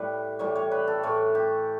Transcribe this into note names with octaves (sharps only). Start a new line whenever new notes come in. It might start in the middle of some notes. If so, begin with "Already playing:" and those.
Already playing: A2 G3 B4
A2 E3 G3 C#5
C#5
B4
A4
A2 E3 A3
G4